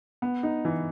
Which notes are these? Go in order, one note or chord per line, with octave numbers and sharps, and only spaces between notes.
B3
D#4
E3